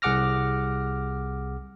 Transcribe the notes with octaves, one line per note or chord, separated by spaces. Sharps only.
C2 G#4 F#5 D6 F6 A#6